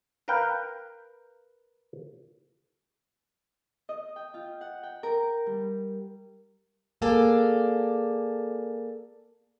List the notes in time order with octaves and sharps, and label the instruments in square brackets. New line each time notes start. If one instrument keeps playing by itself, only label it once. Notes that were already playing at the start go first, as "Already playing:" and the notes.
[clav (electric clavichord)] A#4 B4 F5 G5
[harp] D#5
G5
F4
F#5
G5
A#4
G3
[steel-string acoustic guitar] A#3 G#4 A4 D5